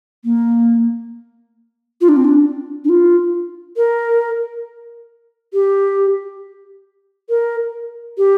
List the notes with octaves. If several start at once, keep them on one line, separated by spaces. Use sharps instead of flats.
A#3
F4
D4
C4
D4
D4
F4
A#4
G4
A#4
G4